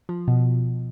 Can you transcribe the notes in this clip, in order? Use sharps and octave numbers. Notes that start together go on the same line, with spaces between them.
F3
B2